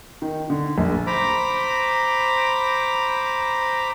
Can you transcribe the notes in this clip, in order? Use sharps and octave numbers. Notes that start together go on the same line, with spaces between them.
D#3
D3
A#1
C5 A#5 B5 D6